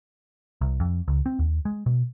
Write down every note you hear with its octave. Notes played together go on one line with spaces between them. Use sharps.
C2
F2
C#2
C4
D#2
G#3
B2